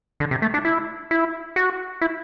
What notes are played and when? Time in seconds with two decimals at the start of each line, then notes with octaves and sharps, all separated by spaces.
0.20 D3
0.31 C3
0.42 A3
0.54 D4
0.65 E4
1.11 E4
1.56 F#4
2.01 E4